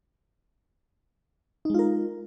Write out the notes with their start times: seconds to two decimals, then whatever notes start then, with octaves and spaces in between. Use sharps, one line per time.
1.65 D#4
1.70 G#3
1.74 F4
1.79 A#4